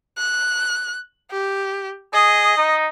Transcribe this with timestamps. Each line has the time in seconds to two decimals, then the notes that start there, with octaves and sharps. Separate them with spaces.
0.18 F#6
1.31 G4
2.14 G#4 D#5
2.57 D#4